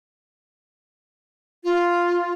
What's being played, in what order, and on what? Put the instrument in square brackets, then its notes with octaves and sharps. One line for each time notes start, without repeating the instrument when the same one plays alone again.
[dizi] F4